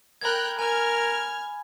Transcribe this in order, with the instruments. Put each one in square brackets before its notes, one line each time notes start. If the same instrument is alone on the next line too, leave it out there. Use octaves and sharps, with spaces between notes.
[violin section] A#4 G5 F#6 [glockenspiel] B5 G#6
[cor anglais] A#4 [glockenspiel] G#5 [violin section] F6 G#6